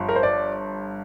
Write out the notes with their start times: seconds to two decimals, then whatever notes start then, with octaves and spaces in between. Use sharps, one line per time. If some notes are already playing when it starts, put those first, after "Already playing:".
Already playing: G1 G2 F3
0.09 A#4
0.16 C5
0.23 D5